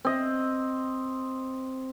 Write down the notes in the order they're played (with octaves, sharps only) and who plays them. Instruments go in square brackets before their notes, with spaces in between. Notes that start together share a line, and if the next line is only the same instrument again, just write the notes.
[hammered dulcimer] C4 D#5